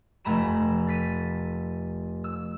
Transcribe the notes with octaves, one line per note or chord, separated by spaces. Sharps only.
F1 A3 A#5 B5 E7
A6 B6 D#7
E6